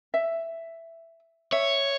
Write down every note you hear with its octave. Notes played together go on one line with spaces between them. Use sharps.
E5
C#5 E5